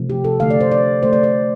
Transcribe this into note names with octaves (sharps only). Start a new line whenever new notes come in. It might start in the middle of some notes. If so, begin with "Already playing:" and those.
Already playing: C3 F3 A3
G4
A4
D3 F3 A3 F5
D5
C5
D5
D3 A3 C5
D5
D5